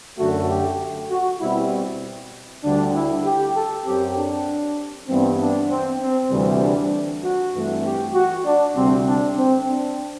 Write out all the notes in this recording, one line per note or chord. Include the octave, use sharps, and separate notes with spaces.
F#2 D3 A3 F#4
G4
F#4
B2 G3 C4 E4
D2 D3 G3 D4
E4
G4
A4
F#2 F#3 C4 G4
D4
G2 E3 G3 B3 C4
D4
C4
C4
D2 C3 E3 G3
D4
F#4
G2 E3 A3 C4
G4
F#4
D4
D2 C3 G3 C4
D4
C4
D4